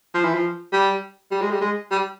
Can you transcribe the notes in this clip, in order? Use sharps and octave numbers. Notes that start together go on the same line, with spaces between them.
F3
E3
F3
G3
G3
G#3
G3
G#3
G3